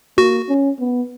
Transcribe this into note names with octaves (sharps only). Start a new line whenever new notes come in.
A#3 F#4
C#4
B3